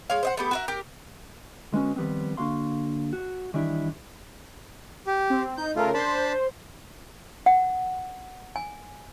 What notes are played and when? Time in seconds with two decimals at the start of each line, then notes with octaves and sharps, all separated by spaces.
0.10 G#3 C#5 F5
0.23 C5 D#5 F#5
0.37 A3 B3 G4
0.51 F#4 A#4 E5
0.68 G4 A#4
1.73 D2 G#3 B3 C#4 F#4
1.96 D#3 F3 G3 B3 C4
2.37 D3 A#3 F#4 F5 C6
3.13 F#4
3.54 D#3 E3 G3 D4 E4
5.07 G4
5.30 C4
5.57 D#4 G6
5.76 C#3 A3 F4 A#4
5.94 D4 C5 A5 B5
7.46 F#5
8.56 G#5